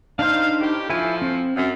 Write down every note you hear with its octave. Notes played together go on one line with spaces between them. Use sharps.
D4 D#4 C5 F5
A2 G4
A2 F3 E4 G#5
C4
F#2